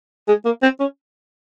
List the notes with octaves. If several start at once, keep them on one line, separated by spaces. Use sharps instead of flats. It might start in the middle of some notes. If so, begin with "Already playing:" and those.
G#3
A#3
C4
C#4